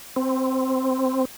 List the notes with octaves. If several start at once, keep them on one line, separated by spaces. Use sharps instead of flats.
C4